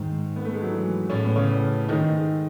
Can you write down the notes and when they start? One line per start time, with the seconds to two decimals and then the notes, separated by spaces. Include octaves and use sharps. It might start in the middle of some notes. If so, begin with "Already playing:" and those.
Already playing: G#2 D#3
0.36 B3
0.45 A3
0.53 G#3
0.62 F#3
0.70 E3
1.10 A2 C#4
1.23 B3
1.36 C#3 C#4
1.89 G#2 D#3 D#4